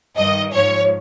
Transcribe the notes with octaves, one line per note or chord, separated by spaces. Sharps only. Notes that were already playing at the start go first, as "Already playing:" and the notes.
G2 D#3 D#5
G#2 F3 C#5